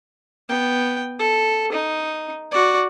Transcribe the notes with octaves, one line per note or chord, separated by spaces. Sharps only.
B3 G5
A4
D#4
F#4 D5